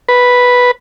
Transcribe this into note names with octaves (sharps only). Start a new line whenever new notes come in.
B4